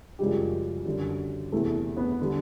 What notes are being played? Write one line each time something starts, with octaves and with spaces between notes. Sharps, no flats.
F#2 C#3 F3 G3 G#3 G4
F#2 D3 G3
E2 C3 E3 A3 A4
B3 B4
D3 G3